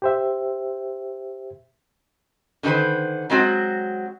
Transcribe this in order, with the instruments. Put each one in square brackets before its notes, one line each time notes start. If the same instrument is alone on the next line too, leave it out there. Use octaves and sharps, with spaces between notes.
[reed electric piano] G4 C5 E5
[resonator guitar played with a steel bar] D3 D#3 F#4 B4 C5
F#3 G#3 C4 F#4